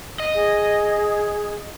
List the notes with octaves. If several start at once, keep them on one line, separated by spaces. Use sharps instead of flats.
D#5
G#4